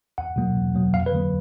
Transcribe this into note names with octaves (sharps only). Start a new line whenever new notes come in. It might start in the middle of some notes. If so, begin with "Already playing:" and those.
E2 F#5
B2 F#3 A#3
E2
B2 F#3 A#3
F2 F5
B4
D3 F#3 A#3